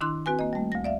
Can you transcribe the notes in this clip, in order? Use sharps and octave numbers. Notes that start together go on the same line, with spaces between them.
D#3 D4 E4 C6 F#6
C4 F#4 B4 G#5
A#3 D#5
G3 A3
D2 A#6
D5 E5 F5